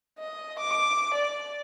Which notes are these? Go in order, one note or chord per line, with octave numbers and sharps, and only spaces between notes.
D#5
D6
D5